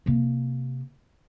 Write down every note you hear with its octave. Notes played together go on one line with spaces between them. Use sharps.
C3 A#3